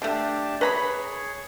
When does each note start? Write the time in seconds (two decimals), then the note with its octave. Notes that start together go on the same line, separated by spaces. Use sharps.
0.02 D3 A3 D4 G4 A5
0.61 G#4 B4 C#5 A#5 B5